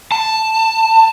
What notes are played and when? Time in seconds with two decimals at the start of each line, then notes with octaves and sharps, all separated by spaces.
0.12 A5